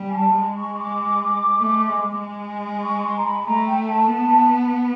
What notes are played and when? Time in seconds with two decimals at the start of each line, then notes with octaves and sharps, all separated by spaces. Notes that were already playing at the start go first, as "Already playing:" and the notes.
Already playing: G3
0.09 G#5
0.15 A5
0.35 G#3
0.55 C#6
0.76 D6
1.59 A3
1.89 G#3
2.21 G#3
2.82 C#6
3.03 C6
3.17 A#5
3.23 B5
3.45 A3 A#5
3.65 G5
3.86 A5
4.07 B3